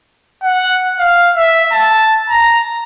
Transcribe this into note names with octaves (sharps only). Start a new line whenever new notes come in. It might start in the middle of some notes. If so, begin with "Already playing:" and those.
F#5
F5
E5
A5
A#5